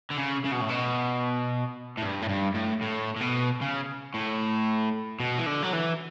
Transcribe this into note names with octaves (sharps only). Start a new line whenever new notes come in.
D3
C#3
C#3
B2
A2
B2
A2
G2
A2
G2
A2
A2
A2
B2
C#3
A2
B2
E3
D3
F#3
E3